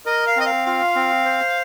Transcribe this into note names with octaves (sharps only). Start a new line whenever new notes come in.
A#4 D#5
F5
C4 D#5
F5
F4 F5
C4
C5